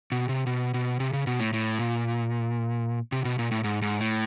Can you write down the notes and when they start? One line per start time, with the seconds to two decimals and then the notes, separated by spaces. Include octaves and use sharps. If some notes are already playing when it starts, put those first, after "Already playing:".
0.12 B2
0.29 C3
0.47 B2
0.74 B2
1.00 C3
1.13 C#3
1.27 B2
1.39 A2
1.53 A2
1.79 A#2
3.12 C3
3.25 B2
3.39 A#2
3.51 A2
3.64 G#2
3.82 G#2
4.00 A2